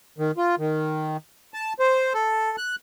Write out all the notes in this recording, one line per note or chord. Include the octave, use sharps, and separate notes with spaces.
D#3
F4
D#3
A5
C5
A4
F#6